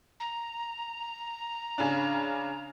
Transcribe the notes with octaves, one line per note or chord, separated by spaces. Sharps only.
A#5
C#3 C#4 D4